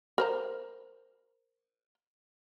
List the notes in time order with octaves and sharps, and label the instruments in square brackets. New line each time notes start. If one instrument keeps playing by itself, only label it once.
[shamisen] A#4 C5 A#5